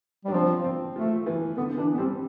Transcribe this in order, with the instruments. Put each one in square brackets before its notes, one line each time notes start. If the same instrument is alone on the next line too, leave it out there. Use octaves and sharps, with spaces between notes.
[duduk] G3 [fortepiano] D4
[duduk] F3 [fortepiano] C4
[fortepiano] C4
[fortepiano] F3 [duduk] A3
[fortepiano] E3
[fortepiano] D3 [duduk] B3
[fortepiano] E3 [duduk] D4
[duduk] B3
[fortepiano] G3 [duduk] C4